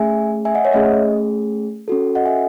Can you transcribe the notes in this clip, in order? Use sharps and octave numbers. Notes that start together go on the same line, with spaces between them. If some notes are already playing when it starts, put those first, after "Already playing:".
Already playing: A3 C#4 G#4 E5 G#5
E5 G#5
D#5 F#5
C#5 E5
A3 C#4 G#4 D#5
C#4 F#4 A4
D#5 F#5
E5 G#5